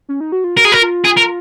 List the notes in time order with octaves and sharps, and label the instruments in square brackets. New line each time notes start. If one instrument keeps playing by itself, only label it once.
[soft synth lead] C#4
D#4
F#4
F4
[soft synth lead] F#4 [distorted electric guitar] A#4
[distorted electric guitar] G#4
A#4
[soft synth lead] F4
[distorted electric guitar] G#4
A#4